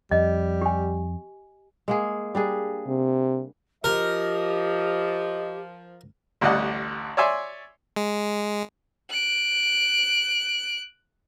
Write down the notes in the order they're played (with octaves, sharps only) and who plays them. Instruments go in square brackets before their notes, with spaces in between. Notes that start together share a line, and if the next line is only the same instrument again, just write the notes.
[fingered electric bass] F2 [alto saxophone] G3 [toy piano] D#5
[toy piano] G4 G#5
[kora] G#3 A#3 G#4
G3 D4 G#4
[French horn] C3
[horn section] F3 [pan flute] G4 [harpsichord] A#4 [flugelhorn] D#5
[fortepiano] A1 D2 G3 D5 D#5 F#5
C#5 D5 E5 G#5 C6
[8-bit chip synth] G#3
[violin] F#6 D7